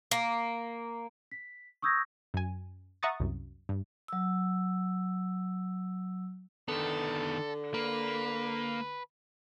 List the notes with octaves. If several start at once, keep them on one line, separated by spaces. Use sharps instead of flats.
A#3
B6
C#6 D#6 E6 G6 G#6 A#6
F#2 G#5
E5 F#5 A#5 C#6 D#6 A6
C2 F#2
G2
F#3 E6
D3 D#3 B3 A4
A#3 B4